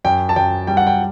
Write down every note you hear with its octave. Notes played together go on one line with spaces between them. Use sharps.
F#2 G5
A5
F#2 G5
G3 G5
F#5
G5